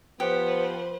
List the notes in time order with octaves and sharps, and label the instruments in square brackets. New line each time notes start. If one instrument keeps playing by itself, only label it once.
[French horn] F3 [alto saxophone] B3 [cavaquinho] G4 [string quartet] B4 C5